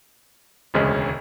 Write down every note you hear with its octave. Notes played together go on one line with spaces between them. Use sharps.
E1 D2 C#3 G#3 C#4